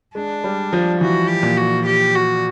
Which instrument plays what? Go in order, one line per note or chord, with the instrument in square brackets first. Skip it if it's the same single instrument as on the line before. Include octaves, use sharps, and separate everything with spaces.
[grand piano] G#3 [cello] D4
[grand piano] G3
F3
[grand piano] E3 [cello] F#4
[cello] G4
[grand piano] A#2
[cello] F#4
G4
F#4